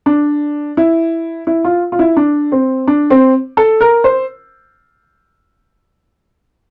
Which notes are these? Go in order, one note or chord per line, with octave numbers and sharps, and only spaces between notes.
D4
E4
E4
F4
F4
E4
D4
C4
D4
C4
A4
A#4
C5